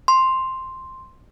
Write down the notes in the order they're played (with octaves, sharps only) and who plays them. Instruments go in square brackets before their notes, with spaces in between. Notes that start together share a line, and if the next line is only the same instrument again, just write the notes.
[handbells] C6